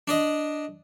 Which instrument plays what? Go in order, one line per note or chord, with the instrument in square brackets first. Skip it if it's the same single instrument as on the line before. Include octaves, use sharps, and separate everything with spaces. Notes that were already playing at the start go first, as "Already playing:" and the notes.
[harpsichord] D4 D5 D#5